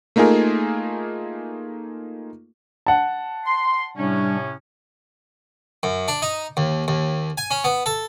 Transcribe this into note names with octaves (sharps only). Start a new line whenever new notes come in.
A3 A#3 D#4 F4 G#4 A#4
F#5 A5
C6
A2 C3 G3 C#4 D4
F#2
D4
D#4
D#2
D#2
G#5
C#4
B3
A4